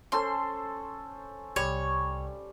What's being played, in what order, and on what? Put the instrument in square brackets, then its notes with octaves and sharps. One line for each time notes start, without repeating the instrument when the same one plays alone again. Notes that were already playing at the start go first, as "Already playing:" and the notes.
[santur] C#4 A4 C5 [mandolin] C6
[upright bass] C2 [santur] G3 [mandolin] C#5